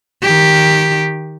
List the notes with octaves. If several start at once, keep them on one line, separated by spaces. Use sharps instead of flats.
D#3 G4